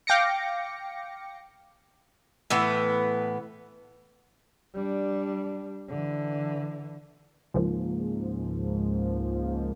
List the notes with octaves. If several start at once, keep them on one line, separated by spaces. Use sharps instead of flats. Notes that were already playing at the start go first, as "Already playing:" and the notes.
F5 G5 D6 A#6 C#7
A2 E3 B3
G3 D4
D3 E3
C#2 G#2 F3 A#3